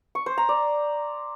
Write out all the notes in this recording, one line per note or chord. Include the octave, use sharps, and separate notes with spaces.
C#6
C5
A#5
D5